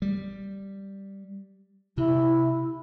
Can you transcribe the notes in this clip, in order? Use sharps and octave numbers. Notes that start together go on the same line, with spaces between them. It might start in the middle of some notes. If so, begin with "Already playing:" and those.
G3
C3 E4